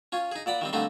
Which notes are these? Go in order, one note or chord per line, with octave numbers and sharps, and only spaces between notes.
C#4 F4 G#5
D#4 G#4
A#2 D5 F#5 B5
D#3 G3 C4
D3 G3 A3 A#3 C4 D#4